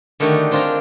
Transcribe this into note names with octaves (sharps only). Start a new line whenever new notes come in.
D3 D#3 A3 F#4 G4
G#3 C4 D4 F4 G5 A#5